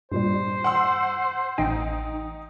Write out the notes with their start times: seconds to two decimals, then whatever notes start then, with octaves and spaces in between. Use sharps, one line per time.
0.12 G2 A#2 G3 C5
0.64 F#5 C6 E6
1.58 A1 D#4 D#5 G5